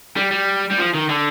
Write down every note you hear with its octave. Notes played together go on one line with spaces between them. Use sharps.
G3
G3
G3
F3
D#3
D3